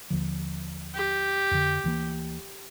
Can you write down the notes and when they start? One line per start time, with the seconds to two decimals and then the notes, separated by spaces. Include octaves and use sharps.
0.10 D#2 D3 F3
0.95 G4
1.51 F2 D3
1.84 D2 E3 A#3